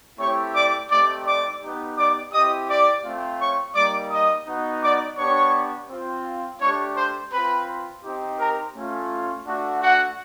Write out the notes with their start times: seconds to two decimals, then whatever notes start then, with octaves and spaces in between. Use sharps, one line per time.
0.18 A3 C4 E4 G4 C#5 C#6
0.54 D5 D6
0.89 A3 C4 D#4 G4 D5 D6
1.25 D5 D6
1.61 B3 D#4 G4
1.97 D5 D6
2.32 C4 E4 G4 D#5 D#6
2.68 D5 D6
3.04 A3 C4 F4
3.39 C#5 C#6
3.75 G3 A#3 D#4 D5 D6
4.11 D#5 D#6
4.46 B3 D#4 F#4
4.83 D5 D6
5.18 B3 D4 G4 C#5 C#6
5.90 C4 F4
6.61 A3 D4 G4 C#5 C#6
6.96 C5 C6
7.32 C4 F4 B4 B5
8.03 C4 D#4 G4
8.39 A#4 A#5
8.75 A3 C#4 F4
9.46 A3 D4 F#4
9.82 F#4 F#5